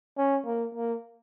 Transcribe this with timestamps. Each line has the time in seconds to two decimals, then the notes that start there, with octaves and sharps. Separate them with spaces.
0.18 C#4
0.46 A#3
0.75 A#3